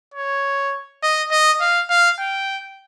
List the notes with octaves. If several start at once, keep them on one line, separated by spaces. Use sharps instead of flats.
C#5
D#5
D#5
F5
F5
G5